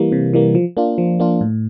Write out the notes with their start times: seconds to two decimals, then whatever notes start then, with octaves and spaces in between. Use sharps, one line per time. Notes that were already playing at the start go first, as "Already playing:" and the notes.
Already playing: E3 G3 A#3
0.12 C3
0.34 E3 G3 A#3
0.55 F3
0.77 A#3 D4 F4
0.98 F3
1.20 A#3 D4 F4
1.41 A2